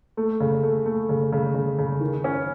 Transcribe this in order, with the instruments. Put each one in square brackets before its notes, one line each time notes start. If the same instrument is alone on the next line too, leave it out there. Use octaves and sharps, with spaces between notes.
[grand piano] A3
C#3
A3
A3
C#3
C#3
C#3
C#3
D#3
C#4